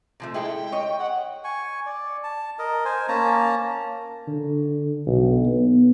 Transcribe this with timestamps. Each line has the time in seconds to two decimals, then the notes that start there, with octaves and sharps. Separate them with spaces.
0.20 C3 F3 A3
0.34 G#3 E4 A4 G5
0.72 C#5 D#5
0.99 F#5
1.44 G#5 C#6
1.86 D5
2.23 A5
2.59 A#4 D#5
2.85 C5 G#5
3.08 A#3 C#4 A5 A#5
4.28 D3
5.07 B1
5.46 B3